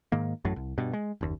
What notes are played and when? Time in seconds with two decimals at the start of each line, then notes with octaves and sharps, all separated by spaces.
0.12 G#2 D#3 A#3
0.45 A1 F#2 A2 F#3
0.56 C2
0.78 G2 B2
0.93 G#3
1.21 F#1 D#2